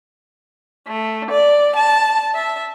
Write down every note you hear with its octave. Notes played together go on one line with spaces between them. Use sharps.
A3
D5
A5
E5